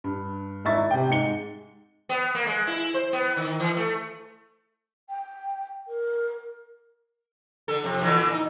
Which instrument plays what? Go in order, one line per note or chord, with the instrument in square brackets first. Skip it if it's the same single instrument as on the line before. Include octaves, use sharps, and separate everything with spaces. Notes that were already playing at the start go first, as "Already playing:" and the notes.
[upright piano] G2
G#1 E4 E5 C#6 A6
C3 G5
G#2 G#3 C#7 G7
[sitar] B3
A#3
G#3
E4
C5
B3
D#3
E3
A3
[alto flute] G5
A#4
[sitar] D3 A4
F2 C3
A#2 D3 E3
D#4